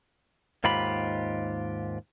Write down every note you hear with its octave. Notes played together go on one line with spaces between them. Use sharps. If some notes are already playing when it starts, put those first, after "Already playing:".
D#2 G#2 F4 G4 B5